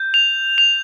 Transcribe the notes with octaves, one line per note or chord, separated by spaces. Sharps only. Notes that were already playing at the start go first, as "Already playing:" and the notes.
Already playing: G6
F7
F7